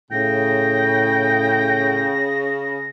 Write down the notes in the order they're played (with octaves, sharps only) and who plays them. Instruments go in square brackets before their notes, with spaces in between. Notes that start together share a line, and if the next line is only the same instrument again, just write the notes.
[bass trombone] A2 [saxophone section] C#3 [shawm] G5 [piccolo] A#6